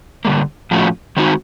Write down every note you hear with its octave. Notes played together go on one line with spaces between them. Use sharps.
D3 G3 A#3
A2 F3 A3 C#4 F#4
D#3 G#3 C4 D#4 F#4